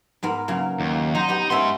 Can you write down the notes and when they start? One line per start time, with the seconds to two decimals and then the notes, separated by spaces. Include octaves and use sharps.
0.23 G#2 B3 A#4
0.48 C#3 F#3 A#3
0.80 D#2
1.15 F#3 D#4 C5 D#5
1.28 B3 G4 D#5
1.50 G#2 B3 C#4 E5 C6